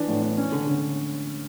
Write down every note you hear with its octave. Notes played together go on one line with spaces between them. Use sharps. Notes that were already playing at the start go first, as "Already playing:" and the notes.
Already playing: E3 D4
A2
D4
C#4
D3
D3